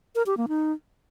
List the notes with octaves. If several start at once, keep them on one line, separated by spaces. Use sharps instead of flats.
A#4
G4
A#3
D#4